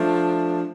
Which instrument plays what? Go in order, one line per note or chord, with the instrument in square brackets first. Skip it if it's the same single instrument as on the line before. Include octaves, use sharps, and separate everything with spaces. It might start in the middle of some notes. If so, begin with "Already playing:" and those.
Already playing: [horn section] F3 A3 D4